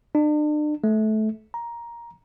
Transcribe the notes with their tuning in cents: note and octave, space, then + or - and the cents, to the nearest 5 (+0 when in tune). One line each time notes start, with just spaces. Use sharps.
D4 +40
A3 -20
A#5 +10